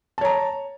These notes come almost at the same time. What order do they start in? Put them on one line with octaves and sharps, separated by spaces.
A5 C#5 A#5